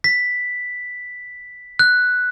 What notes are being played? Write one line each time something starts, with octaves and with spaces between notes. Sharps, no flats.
B6
F#6